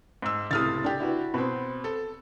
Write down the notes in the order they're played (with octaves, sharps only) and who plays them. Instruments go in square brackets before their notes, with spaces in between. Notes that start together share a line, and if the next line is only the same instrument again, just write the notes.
[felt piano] G#2 E6
[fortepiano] C#2 A2 C3 [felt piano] D#6 F6 A6
[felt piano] D4 G4
[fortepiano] E4 F#4 B4
[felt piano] B2 [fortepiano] C4 B4
[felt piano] A4